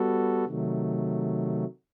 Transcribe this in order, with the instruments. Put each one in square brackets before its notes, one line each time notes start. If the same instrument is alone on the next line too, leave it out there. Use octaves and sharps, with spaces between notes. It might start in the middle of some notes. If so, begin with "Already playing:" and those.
Already playing: [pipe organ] G3 B3 F#4 A4
C3 D#3 F#3 A3